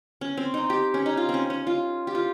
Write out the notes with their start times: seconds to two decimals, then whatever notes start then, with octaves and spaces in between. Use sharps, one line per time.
0.21 C#4
0.37 C4
0.54 D#4
0.70 G4
0.94 C#4
1.06 D#4
1.17 F4
1.29 C4
1.34 C#4
1.50 C#4
1.67 F4
2.07 G4
2.15 F4